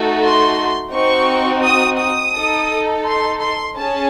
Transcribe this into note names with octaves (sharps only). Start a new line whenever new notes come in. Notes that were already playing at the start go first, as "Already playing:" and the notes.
Already playing: A3 D#4 F#4 A4
C6
C4 D#4 F#4 C#6
D#6
D#6
D#4 A4
C6
C6
C#4 G#4 A5